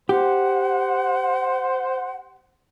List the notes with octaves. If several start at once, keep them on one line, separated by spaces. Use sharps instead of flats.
G4 C5 F#5